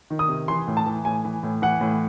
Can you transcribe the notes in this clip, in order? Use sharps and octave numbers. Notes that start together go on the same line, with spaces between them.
D#3
D#6
C3
E3 C6
A2
A5
E3
A2 G#5
E3
A2
E3 F#5
A2